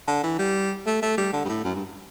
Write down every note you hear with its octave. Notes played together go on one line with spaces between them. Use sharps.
D3
E3
G3
A3
A3
G3
D3
G2
A2
F#2
G2